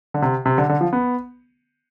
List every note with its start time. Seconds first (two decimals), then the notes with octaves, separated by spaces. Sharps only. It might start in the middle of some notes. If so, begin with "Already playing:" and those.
0.14 D3
0.22 C3
0.46 C3
0.58 D3
0.69 D3
0.81 F3
0.93 B3